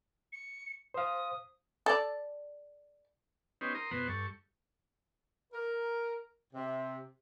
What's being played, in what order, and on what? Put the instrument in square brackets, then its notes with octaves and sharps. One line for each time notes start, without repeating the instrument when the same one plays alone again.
[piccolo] C#7
[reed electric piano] C5 F5 [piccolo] D#6
[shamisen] A4 D5
[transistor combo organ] B3 C#4 D#4 G4 C5
A#4 A#5 C6 D#6
F2 B2 B3 C5 F#5
G2 A4 C#6
[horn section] A#4
C3